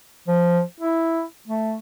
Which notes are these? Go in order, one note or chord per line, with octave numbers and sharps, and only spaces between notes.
F3
E4
A3